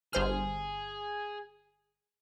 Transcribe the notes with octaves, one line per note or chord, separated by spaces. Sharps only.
G1 G#4 C5 F6